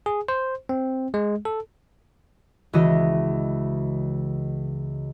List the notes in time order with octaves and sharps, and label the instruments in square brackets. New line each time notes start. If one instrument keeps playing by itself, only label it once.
[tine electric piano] G#4
C5
C4
G#3
A4
[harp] C#2 E3 F#4 D#5 G#5